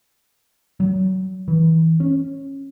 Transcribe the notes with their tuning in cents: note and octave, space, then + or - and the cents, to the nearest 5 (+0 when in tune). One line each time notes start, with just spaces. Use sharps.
F#3 +25
E3 -25
C#4 -15